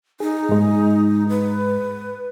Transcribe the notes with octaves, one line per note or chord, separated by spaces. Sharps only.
D#4 G#4
G#2 G#3
B4